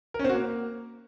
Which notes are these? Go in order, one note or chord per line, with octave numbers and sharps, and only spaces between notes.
A#4
C#4
C4
F#4
A#3